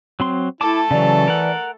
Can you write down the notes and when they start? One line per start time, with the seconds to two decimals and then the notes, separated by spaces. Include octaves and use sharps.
0.20 F#3 C4 C6
0.61 A3 E4 A4 A5 D6
0.91 C#3 E3 F#3 D5
1.28 A#4 F#5